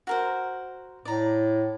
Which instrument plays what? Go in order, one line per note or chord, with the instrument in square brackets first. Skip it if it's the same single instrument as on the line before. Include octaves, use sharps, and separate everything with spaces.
[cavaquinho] F#4 A#4 C5
[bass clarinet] A2 [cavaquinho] D5 A#5